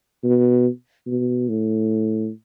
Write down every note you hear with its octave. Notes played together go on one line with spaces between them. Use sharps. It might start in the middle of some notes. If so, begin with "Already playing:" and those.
B2
B2
A2